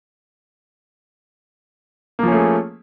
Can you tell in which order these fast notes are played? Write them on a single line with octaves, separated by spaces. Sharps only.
A#3 F3 C#4 A3 G#4